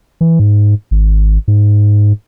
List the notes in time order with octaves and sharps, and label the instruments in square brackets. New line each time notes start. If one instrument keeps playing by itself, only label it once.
[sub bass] E3
G#2
G#1
G#2